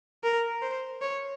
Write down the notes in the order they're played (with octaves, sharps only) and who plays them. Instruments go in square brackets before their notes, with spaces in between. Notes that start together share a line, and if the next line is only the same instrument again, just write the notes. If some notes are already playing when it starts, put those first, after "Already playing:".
[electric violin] A#4
C5
C#5